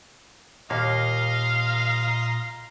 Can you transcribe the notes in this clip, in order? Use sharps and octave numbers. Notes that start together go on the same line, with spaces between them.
D#2 A#2 A#3 D#5 F5 A#5 C6